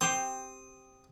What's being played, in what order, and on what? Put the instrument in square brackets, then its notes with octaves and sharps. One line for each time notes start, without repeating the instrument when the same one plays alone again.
[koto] C4 G4 C5 [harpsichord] D#6